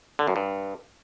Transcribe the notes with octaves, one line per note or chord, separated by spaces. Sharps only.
D3
F#2
G2